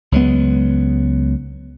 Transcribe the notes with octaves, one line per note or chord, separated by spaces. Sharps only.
C#2 F#3 G#3 B3